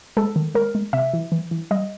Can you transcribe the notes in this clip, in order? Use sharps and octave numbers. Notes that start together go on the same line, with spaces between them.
G#3 A4
D#3
G#3 A#4
G#3
C3 E5
E3
E3
E3
G3 D#5